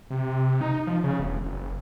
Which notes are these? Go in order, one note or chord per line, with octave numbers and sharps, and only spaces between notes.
C3
D#4
F3
C#3
E1
F#1